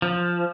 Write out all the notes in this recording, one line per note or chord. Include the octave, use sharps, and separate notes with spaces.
F3